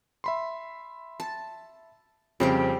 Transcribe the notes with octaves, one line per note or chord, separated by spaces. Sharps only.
E5 B5 C6
A5
F2 C#3 G3 C4 G4